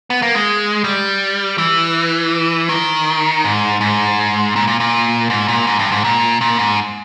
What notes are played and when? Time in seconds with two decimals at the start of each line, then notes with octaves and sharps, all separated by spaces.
0.10 B3
0.22 A#3
0.35 G#3
0.84 G3
1.58 E3
2.69 D#3
3.44 G#2
3.81 G#2
4.56 A#2
4.68 A#2
4.80 A#2
5.30 G#2
5.48 A#2
5.67 G#2
5.79 G2
5.91 G#2
6.04 A#2
6.41 A#2
6.59 G#2